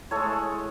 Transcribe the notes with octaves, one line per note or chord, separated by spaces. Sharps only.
A2 G#3 A4 C#5